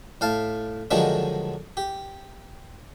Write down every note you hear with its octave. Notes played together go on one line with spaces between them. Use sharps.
A2 F5 A5
D3 D#3 F3 F#3 G#3 D4
G4